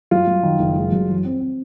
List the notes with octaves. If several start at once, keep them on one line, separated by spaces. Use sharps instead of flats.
F#2 F4
F#2
D#3
F#1
G#3
F#2
E3
C4
C4